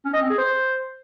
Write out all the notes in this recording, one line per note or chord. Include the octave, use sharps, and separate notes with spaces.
C#4
D#5
C4
G#4
C5